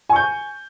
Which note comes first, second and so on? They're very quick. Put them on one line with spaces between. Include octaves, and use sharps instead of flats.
G#5 C#6 G6